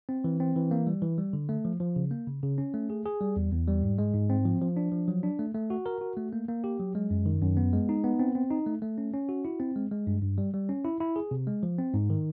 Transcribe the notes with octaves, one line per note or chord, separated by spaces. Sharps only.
C4
E3
C4
E3
A#3
G3
E3
G3
D3
A3
F3
F3
C#3
A#3
C#3
C#3
C#4
A3
G#4
G#4
G3
E2
E2
G3
G#2
G#3
G#2
C4
F3
F3
D4
F3
F#3
D4
A3
A3
F#4
A#4
F#4
A3
A#3
A#3
G4
F#3
G#3
F#2
D#3
F#2
B3
G#3
D#4
B3
C4
C4
D#4
A3
A3
C#4
C#4
F#4
E4
C4
G#3
G#3
G2
G2
G3
G3
C#4
E4
E4
G#4
C3
G#3
F3
C4
G#2
D#3